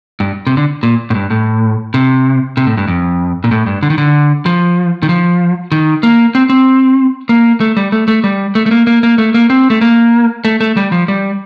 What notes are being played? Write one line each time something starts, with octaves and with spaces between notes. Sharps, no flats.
G2
C3
D3
A#2
A2
G2
A2
C3
C3
A2
G2
F2
A#2
A2
G2
D3
D#3
D3
F3
D#3
F3
D#3
A#3
C4
C4
A#3
A3
G3
A3
A3
G3
A3
A3
A#3
A#3
A#3
A3
A#3
C4
A3
A#3
A3
A3
G3
F3
G3